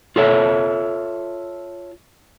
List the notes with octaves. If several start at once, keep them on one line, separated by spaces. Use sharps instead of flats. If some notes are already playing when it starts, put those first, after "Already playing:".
F4 A4 C#5 E5